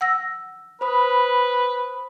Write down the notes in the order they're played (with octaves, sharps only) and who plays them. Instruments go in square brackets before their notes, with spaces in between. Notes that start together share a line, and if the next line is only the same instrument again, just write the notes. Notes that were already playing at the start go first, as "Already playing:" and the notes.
[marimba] F#5 E6 A#6
[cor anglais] B4 [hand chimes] C5 B5 D#6